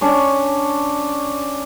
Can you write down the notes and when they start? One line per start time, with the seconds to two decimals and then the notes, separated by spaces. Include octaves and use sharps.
0.01 C#4 D4 C#5